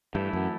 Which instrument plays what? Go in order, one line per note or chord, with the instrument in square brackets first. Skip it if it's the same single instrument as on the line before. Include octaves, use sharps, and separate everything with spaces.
[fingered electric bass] G2 [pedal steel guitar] E3 A3 E4 A4
[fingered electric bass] F#2